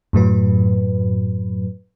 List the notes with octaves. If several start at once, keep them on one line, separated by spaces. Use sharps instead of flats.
F#2 A2 F#3 B4